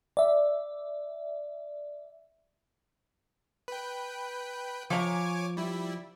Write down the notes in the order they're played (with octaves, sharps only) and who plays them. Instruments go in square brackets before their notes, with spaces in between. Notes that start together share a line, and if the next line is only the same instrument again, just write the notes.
[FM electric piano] D5 E5
[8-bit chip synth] B4 G5
[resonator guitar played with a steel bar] F3 A#5 [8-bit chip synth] C#5 G#5 D6
[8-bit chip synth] G3 E4